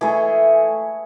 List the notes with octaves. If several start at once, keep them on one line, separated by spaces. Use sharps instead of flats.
E3 A3 E4 G#4